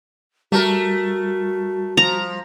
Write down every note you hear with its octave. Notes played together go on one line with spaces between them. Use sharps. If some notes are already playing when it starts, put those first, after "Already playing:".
G3 A3 F#4 A#4
F3 A#5